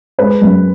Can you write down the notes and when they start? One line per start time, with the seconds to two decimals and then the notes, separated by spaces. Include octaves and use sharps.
0.18 G#3 B4
0.41 F#2